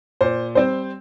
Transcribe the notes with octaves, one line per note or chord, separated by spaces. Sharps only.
A#2 C5
G3 C4 C5